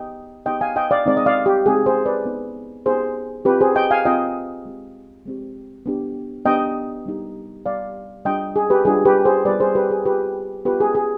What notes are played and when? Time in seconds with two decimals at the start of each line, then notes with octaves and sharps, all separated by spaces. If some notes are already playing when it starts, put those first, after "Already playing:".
Already playing: B3 D#4 G4 D#5 G5
0.46 B3 D#4 G4 D#5 G5
0.61 F5 G#5
0.76 D#5 G5
0.91 D5 F5
1.06 G#3 C4 D#4 D5
1.17 D#5
1.26 D5 F5
1.46 G4
1.66 G#3 C4 D#4 G#4
1.86 G#4 C5
2.06 B4 D5
2.25 B3 D#4 G4
2.86 B3 D#4 G4 G#4 C5
3.45 C4 F4 G4 B4
3.61 G#4 C5
3.75 D#5 G5
3.91 F5 G#5
4.05 C4 F4 D#5 G5
4.65 G#3 C4 G4
5.26 G#3 C4 G4
5.86 B3 D4 G4
6.45 B3 D4 G4 D#5 G5
7.06 G3 B3 D#4 G4
7.65 G3 B3 D#4 G4 D5 F5
8.25 G3 D4 F4 D#5 G5
8.56 G#4
8.70 G4 B4
8.85 G3 D4 F4 G#4
9.05 G4 B4
9.25 G#4 C5
9.45 G3 B3 F4 B4 D5
9.60 G#4 C5
9.75 G4 B4
9.90 G#4
10.05 G3 B3 F4 G4 B4
10.65 B3 F4 G4 B4
10.80 G#4
10.95 G#4